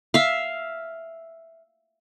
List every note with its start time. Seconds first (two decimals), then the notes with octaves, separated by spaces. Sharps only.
0.14 E5 F5